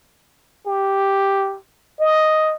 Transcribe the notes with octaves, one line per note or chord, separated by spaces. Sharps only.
G4
D#5